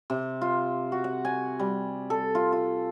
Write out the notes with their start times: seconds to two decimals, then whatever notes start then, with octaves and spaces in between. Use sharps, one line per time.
0.10 C3
0.41 F4
0.92 F#4
1.04 F#5
1.25 G#5
1.59 G3
2.10 A4
2.35 F4
2.52 F4